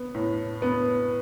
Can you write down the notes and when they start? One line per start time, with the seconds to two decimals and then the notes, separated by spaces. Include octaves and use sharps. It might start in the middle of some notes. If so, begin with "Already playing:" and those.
Already playing: B3
0.14 A2
0.62 B3